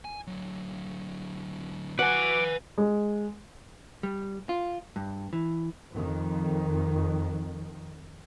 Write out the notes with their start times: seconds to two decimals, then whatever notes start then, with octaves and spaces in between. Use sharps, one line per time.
0.05 G#5
0.27 D3 F#3
1.99 F#4 B4 F#5 G#5 D6
2.78 G#3
4.03 G3
4.49 F4
4.96 G2
5.33 E3
5.93 F2 D#3